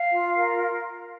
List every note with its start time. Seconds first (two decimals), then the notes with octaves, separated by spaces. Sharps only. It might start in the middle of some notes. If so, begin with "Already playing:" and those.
Already playing: F5
0.12 F4
0.36 A#4